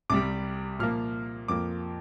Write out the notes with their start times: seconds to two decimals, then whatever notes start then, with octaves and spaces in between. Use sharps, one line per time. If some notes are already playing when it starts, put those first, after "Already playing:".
0.10 C2 C3 G3 D6
0.79 A#2 F3 A#3 F6
1.48 F2 F3 A#3 D6